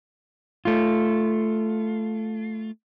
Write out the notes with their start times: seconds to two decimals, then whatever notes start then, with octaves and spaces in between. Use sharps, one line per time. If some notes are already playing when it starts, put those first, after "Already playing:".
0.65 A3 F4